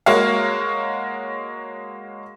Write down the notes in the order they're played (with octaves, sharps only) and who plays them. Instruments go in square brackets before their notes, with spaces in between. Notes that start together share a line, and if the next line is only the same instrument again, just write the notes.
[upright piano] G#3 A#3 F#4 A#4 C#5 F5